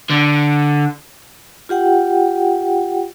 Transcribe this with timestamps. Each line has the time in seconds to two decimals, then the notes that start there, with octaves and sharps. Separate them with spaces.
0.10 D3
1.69 F4 G4 F#5 G5